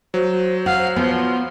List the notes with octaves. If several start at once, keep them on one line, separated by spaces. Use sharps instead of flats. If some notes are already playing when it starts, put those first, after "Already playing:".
F#3 C5
F5 F#5
F3 B3